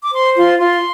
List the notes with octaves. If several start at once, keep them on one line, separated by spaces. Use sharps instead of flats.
D6
C5 C6
F4 C6
F4 C6